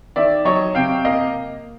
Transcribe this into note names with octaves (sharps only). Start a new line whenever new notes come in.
D#3 D5 E5
F#3 C#5 D#5
C3 F5 G5
A#3 D#5 F5